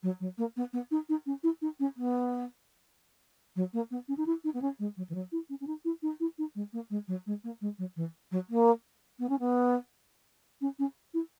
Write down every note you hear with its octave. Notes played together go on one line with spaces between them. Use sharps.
F#3
F#3
A#3
B3
B3
D#4
D#4
C#4
E4
D#4
C#4
B3
F#3
A#3
B3
C#4
D#4
E4
D#4
B3
C#4
G#3
F#3
E3
F#3
E4
C#4
C#4
D#4
E4
D#4
E4
D#4
G#3
A#3
G#3
F#3
G#3
A#3
G#3
F#3
E3
F#3
A#3
B3
C#4
B3
C#4
C#4
E4